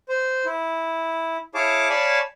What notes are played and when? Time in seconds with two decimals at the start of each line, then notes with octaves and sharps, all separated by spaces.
0.09 C5
0.45 E4
1.55 E4 G#4 C#5 F5 A5 D6
1.89 C#5 D5 F5 G#5 A5 B5